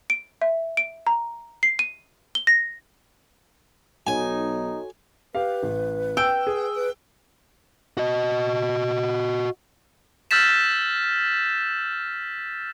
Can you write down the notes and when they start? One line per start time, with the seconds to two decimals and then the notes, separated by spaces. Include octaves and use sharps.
0.10 D7
0.42 E5
0.77 D7
1.07 A#5
1.63 C7
1.79 D#7
2.35 G7
2.47 A#6
4.07 B1 D#4 F#4 A4 C#5 G#5
5.35 G4 B4 F5
5.63 A1
6.17 G5 E6
6.47 G#4
6.75 B4
7.97 F#4 D#5
10.31 E6 F6 G6 A6 B6 E7